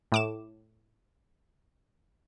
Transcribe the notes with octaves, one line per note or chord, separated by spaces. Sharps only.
A2 D6 E7